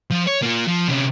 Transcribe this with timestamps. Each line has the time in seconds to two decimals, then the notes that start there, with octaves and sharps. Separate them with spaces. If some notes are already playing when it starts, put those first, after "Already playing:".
0.10 F3
0.27 C#5
0.42 A#3 F4
0.67 F3
0.88 C3 C#4